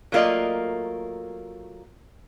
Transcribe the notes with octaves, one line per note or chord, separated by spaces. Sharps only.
F#3 A3 A#3 F4 D5 D#5